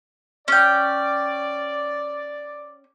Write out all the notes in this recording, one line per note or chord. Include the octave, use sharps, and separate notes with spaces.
C#4 D5 G5